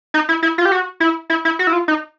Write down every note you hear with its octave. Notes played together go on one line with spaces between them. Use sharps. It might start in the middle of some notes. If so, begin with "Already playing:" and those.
D#4
E4
E4
F4
G4
F#4
E4
E4
E4
F#4
E4
F4
D#4